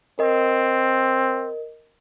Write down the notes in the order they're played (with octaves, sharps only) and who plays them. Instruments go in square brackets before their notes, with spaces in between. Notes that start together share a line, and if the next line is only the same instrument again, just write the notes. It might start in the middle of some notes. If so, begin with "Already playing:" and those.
[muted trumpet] C4 [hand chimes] A#4 D#5